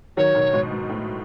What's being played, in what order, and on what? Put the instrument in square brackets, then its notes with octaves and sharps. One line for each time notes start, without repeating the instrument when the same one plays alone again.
[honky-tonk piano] D#3 F#3 [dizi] C#5
[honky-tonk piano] B2 D#3
G#2 B2
G#2
A2